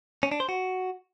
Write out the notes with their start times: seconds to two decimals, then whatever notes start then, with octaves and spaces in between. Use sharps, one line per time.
0.23 C#4
0.32 D4
0.40 C5
0.49 F#4